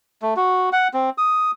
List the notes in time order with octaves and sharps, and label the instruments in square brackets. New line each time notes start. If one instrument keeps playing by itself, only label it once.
[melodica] A3
F#4
F#5
C4
D#6